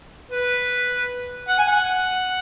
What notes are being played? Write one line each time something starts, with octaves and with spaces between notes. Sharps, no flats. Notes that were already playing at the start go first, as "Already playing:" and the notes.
B4
F#5
G#5
F#5